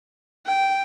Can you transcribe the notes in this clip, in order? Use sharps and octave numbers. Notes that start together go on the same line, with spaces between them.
G5